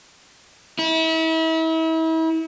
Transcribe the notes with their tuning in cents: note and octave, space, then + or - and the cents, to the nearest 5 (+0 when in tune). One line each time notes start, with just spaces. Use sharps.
E4 -35